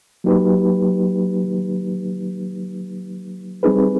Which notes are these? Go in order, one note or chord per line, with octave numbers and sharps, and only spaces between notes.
F#3 A#3 D#4 G4 B4
G3 C4 D#4 G#4 B4